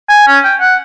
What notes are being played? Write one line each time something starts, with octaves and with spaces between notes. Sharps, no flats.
G#5
C#4
G5
F#5